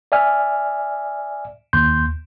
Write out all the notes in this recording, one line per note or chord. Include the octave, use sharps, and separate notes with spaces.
D5 E5 G#5 F6
D#2 C6 G6